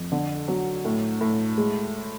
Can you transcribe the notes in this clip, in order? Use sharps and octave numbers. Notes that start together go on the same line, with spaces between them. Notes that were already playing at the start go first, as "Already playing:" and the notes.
Already playing: F2
D3
F#3
A2
A2
G#3